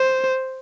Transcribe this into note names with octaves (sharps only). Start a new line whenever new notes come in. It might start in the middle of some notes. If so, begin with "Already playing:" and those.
Already playing: C5